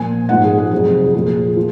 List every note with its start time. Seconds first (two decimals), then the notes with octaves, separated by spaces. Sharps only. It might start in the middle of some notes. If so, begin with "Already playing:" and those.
Already playing: A#2 F3 G#5
0.29 G#2 F3 F#5
0.44 G#4
0.58 G#4
0.71 F2 C3 F#3 G#4
1.14 A#2 F3 G#4
1.56 F3